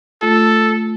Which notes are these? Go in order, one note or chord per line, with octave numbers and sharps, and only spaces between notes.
A3 F4 A4